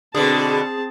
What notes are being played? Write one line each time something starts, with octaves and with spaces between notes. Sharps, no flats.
B2 D3 C4 G#4 A5